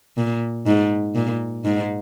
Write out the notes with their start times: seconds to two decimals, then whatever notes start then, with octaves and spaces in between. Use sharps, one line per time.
0.17 A#2
0.67 G#2
1.15 A#2
1.65 G#2